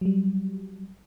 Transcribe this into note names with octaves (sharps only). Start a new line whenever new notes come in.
F#3 G3